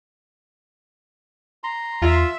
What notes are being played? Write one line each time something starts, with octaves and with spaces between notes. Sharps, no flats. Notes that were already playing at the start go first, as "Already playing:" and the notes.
A#5 C6
E2 F4 E5